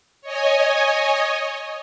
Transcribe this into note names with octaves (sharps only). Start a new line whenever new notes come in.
C#5 D#5 G#5